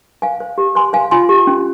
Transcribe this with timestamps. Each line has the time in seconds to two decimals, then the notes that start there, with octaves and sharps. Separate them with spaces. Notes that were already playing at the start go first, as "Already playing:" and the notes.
0.22 C5 F5 G#5
0.40 C5
0.58 G4
0.75 C5 G#5 C6
0.93 C5 F5 G#5
1.11 F4 G#5 C6
1.29 G4
1.47 C#4